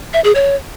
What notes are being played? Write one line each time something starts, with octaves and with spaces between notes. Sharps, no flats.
E5
G#4
C#5